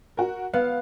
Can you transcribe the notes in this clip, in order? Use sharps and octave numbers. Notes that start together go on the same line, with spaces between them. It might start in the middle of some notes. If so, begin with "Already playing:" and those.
F#4 A#4
B3 F5